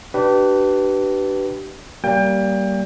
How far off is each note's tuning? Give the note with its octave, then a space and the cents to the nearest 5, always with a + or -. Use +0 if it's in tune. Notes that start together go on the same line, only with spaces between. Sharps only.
D4 +20 G4 -30 B4 +0
G3 -20 A#3 +0 G5 +30